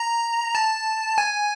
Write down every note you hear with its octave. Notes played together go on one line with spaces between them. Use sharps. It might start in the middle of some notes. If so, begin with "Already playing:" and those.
Already playing: A#5
A5
G#5